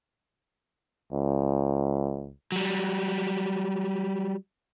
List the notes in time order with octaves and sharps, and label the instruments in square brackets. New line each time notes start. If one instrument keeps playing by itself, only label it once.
[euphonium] C#2
[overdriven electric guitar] F#3 G3